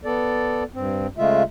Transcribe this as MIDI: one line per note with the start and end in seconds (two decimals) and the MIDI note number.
0.05 0.64 59
0.05 0.64 69
0.05 0.64 74
0.74 1.07 43
0.74 1.07 60
1.18 1.43 49
1.18 1.43 56
1.18 1.43 57
1.18 1.43 65
1.18 1.43 76